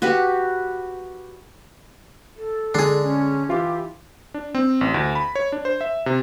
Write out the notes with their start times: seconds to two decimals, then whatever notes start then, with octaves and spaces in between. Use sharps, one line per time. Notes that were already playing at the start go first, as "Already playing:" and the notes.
0.02 F#4 G4 B4 F#5
2.36 A4
2.75 D3 G#3 D4 G#4 C7
3.02 C#4
3.49 E3 E4 F4 G4
4.34 D4
4.55 C4
4.81 A1
4.94 D2
5.15 B5
5.35 C#5
5.52 D4
5.65 C5
5.81 E5
6.06 C3